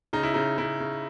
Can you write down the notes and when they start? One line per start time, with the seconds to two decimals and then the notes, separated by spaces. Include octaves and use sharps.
0.13 C#3 D#4
0.23 E4
0.34 C#3 D#4
0.58 C#3 E4
0.80 C#3